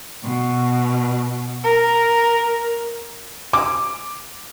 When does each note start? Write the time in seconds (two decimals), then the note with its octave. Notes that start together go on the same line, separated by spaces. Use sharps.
0.23 B2
1.63 A#4
3.53 D6